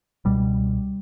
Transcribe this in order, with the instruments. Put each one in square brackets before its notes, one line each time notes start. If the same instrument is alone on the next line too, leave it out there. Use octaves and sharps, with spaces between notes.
[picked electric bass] C#2 B2 G3